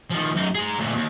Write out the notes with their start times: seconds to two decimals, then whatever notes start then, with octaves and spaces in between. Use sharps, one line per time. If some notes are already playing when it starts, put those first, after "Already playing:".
0.10 D#3 F3
0.35 F#2 D#4
0.55 G#4 A#5
0.78 D2 A#2
0.95 D#2